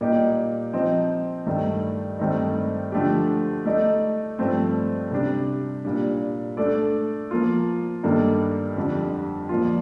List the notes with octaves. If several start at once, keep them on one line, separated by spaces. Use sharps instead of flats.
A#2 G3 A#3 D#4 G4
F3 C4 D#4
G2 D#3 A3
G2 D#3 A3 C4 D#4
D3 F3 A3 D4 G4
A3 D#4 A4 D5
G2 F3 A3 C4
C3 G3 D4
A#2 G3 D4
A3 D4 A4 D5
F3 A#3 F4
G2 D#3 A#3 D4 A4
F2 D3 G3 D4
A#2 F3 A#3 F4